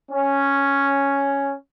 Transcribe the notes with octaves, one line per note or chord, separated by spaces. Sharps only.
C#4